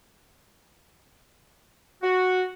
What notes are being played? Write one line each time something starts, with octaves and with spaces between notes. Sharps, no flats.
F#4